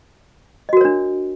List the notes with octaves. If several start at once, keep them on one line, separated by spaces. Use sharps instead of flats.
D4 F#4 A#4 C#5 D#5